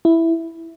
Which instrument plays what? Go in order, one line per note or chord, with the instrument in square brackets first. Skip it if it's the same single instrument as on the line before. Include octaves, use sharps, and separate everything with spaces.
[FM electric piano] E4